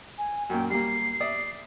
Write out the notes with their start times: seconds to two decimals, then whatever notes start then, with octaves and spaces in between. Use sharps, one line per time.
0.18 G#5
0.50 F#2 A#2 G5
0.70 G3 A#3 C7
1.20 D5 E5 D#6